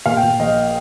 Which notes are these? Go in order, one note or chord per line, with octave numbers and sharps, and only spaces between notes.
A#2 F5
G5
A#2
A#1 D#5